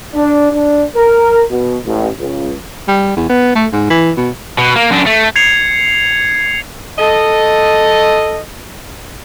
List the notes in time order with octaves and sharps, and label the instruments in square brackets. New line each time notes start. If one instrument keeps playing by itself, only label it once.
[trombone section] D4
D4
A#4
B2
A1
C#2
[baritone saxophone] G3
E2
B3
A3
G#2
E3
B2
[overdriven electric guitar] B2
A#3
F#2 D4
A3
[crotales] G#6 C7 C#7 F7
[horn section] A4 D#5